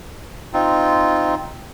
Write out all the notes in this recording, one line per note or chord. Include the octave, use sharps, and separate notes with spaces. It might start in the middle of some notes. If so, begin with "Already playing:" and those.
C4 D#4 F4